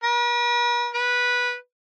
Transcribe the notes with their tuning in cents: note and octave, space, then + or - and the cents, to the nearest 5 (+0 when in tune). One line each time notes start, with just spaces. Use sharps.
B4 -45
B4 -10